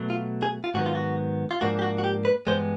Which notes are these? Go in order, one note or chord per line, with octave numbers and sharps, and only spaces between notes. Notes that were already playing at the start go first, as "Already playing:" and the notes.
Already playing: B2 F#3 A3
F4
G#4
F4
G#2 D#3 F#3 B3 F#4
F4
F#4
F4
G#2 F3 A#3 D4 F#4
G4
F#4
F#4
G4
B4
G2 E3 G#3 B3 C5